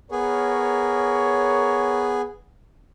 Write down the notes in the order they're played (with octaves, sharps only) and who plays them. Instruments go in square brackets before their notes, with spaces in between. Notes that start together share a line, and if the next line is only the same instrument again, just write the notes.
[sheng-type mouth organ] B3 G#4 [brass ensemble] A#4 C#5